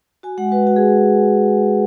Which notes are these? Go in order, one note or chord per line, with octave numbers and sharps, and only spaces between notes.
F#4 G#5
G#3 F#5
F#4 B4
F#4
G#4